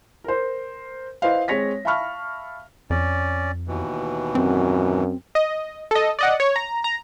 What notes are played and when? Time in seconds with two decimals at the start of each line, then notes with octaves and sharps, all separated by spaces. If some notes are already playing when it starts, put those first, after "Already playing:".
0.24 A#4 C5
1.22 E4 B4 C5 D#5 F5
1.48 G#3 C4 C#5 A#6 B6
1.85 E5 F5 A5 B5 C#6 F6
2.90 F2 C#4 D5
3.68 D#2 B2 E3
4.35 F#2 C4
5.35 D#5
5.91 A4 D#5
6.19 D5 D#5 F#5
6.40 C#5
6.56 A#5
6.84 A#5